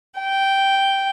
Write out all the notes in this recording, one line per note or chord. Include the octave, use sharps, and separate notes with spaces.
G5